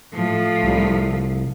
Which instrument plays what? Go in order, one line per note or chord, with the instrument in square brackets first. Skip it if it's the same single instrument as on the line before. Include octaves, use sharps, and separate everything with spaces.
[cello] A2 F3
[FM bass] C2